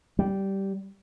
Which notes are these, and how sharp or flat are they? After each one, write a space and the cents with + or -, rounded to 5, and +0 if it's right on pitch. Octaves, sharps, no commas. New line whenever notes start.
G3 -10